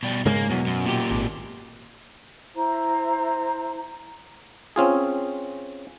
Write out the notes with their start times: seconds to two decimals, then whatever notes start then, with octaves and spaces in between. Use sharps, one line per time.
0.03 B2 G3
0.26 G#2 C#3 G#3 A#3
0.50 E2 B2 F#3
0.67 F#2
0.86 A#2 G4
1.11 G#1
2.55 E4 C5 A#5
4.76 C4 C#4 F4 G#4